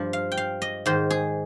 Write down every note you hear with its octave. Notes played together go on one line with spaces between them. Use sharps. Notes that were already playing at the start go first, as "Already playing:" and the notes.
Already playing: G2 F3
F5
G5
F5
D#5
G#2 D#3 C5
G#4